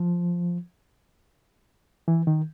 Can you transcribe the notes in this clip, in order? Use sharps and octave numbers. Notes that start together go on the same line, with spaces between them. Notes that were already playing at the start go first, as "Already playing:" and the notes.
Already playing: F3
E3
D#3